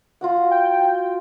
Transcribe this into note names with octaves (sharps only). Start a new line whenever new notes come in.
F4 F#4 F#5
G5